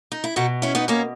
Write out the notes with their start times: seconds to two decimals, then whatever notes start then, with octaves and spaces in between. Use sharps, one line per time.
0.12 D#4
0.24 E4
0.36 B2 D#4 F#4
0.62 C#4 E4
0.75 B3 D#4
0.88 A#3 C#4